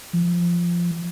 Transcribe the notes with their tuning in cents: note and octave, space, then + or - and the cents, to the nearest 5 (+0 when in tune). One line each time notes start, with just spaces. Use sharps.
F3 -10